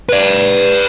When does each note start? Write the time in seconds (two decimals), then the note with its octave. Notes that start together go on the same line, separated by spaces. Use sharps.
0.09 B4 D5